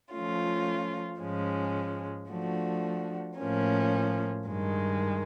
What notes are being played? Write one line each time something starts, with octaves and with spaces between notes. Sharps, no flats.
F3 A3 C#4 F4
G#2 F3 G#3 C#4
F3 A3 D4 F#4
A2 F3 A#3 C#4
G2 D#3 G#3